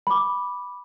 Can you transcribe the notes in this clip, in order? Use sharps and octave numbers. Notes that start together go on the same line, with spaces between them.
B5 D6